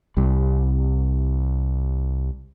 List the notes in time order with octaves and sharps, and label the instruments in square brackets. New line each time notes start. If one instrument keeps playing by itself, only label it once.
[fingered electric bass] C2 G3